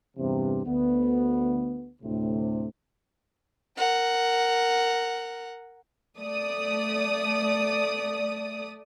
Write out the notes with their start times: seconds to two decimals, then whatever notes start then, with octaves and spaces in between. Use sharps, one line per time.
0.17 E2 G2 C3
0.64 D2 B3
2.02 D2 A2 C3
3.76 A#4 F#5
6.18 A3 D5 D#6